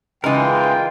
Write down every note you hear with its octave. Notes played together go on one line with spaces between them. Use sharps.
C#3 E3 G#3 D#4 F4 A#4 G5